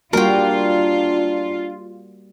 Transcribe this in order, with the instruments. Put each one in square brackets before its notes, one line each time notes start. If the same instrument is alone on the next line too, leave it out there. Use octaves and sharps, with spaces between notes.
[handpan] G3 A#3 F#4 [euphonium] D4 [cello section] F4 [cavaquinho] A#4 G5